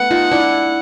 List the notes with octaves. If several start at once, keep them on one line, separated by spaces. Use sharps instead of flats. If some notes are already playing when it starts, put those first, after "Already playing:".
Already playing: A3 B3 F#5
D#4 F4
D4 E4